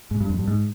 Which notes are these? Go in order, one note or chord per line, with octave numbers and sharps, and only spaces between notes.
G#2
G2
F2
G2
G#2